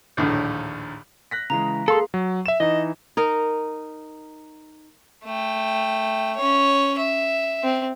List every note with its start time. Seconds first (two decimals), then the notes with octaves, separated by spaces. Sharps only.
0.17 A#1 D#2 A2 D3
1.31 F#6 A#6 B6
1.50 C#3 E3 G#3 A#5
1.88 A#3 G#4 A4 F5 C6
2.14 F#3
2.46 E5 E7
2.60 E3 D#4 D#5
3.17 D#4 A#4
5.25 A3 G5
6.36 C#4 C#5
6.98 E5
7.63 C4